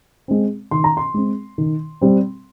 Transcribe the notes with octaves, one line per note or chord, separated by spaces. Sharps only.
G#3 C4
D#3 C6
A#5
C6
G#3 C4
D#3
G3 C4